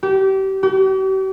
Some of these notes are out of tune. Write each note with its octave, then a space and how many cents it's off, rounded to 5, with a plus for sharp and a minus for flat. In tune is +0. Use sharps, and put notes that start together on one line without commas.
G4 -30
G4 -45